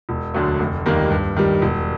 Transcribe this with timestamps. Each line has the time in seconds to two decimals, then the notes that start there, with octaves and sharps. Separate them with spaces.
0.09 E1
0.34 D2 D3 F#3 A3
0.59 F1
0.86 D#2 D#3 G3 A#3
1.11 G2
1.36 D#3 G3
1.62 E1